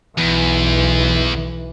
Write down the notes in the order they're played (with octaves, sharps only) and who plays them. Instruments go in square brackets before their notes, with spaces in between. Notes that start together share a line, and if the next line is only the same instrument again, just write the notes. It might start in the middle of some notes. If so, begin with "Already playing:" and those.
[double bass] B1 E3 [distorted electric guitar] E2